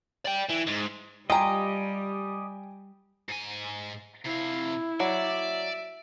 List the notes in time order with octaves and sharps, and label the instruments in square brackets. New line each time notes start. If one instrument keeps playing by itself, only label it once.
[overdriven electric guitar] D5 G5
E3
G#2
[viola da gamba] G3 [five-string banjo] F4 A#5 [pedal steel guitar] G4 D#5 [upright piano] G5 G#5
[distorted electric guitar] G#2 G#5
[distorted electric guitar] C3 F5 [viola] E4
[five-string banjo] F#3 [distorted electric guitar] D5 [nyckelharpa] E5